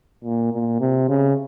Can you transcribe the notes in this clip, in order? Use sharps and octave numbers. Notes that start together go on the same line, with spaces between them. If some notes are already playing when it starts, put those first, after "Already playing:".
A#2
A#2
C3
C#3